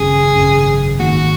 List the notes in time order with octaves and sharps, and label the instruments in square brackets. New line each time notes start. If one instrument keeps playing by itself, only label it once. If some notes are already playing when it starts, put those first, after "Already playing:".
Already playing: [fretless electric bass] G#1 F#2 C#3 [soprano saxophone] G#4
[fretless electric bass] G#1 F#2 C#3
[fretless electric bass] G#1 G#2 D#3 A#3 [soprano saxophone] F#4